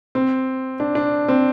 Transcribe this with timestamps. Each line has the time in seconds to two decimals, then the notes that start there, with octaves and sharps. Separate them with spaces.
0.15 C4
0.80 D4
0.95 D4
1.28 C4